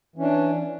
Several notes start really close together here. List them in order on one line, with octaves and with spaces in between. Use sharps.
E3 C#4 D4